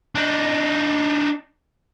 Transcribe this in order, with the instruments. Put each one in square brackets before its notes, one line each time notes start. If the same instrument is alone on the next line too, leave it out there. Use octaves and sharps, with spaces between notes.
[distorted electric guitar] D4 D#4